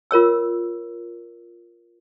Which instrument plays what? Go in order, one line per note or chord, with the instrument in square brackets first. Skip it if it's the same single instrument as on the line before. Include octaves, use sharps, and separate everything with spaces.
[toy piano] F4 A#4 C#5 E6